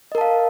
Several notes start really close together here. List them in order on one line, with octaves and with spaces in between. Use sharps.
D#5 A#4 A5 F5